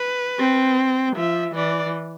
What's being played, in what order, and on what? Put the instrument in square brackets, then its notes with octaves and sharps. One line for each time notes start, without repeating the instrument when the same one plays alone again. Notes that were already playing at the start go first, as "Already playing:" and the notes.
Already playing: [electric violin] B4
[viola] C4
[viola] F3 [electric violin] E5
[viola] E3 [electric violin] D5